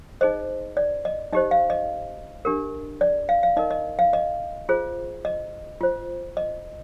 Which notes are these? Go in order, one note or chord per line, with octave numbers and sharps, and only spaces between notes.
D#4 G#4 C5 D#5
D5
D#5
D#4 G4 C5 D#5
F5
D#5
D4 G4 A#4
D5
F5
F5
D#4 A#4 D#5
D#5
F5
D#5
F4 G#4 C5
D#5
F4 C5
D#5